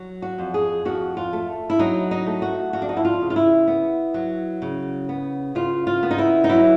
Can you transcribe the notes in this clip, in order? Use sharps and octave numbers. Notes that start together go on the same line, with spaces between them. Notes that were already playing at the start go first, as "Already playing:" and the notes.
Already playing: F#3
F#4
F2
G#4
F2 F#4
F4
A3
E4
F#3 D#4
D#4
A3
F#4
F2 F#4
D4
D#4
E4
F4
C#3
F4
E4
B3
F#3
C#3
B3
C#3 F4
F4
B3
D#4
E4
D#4
F#3 E4